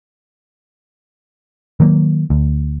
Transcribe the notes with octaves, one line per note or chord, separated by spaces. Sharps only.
D#3 F#3 A#3
D2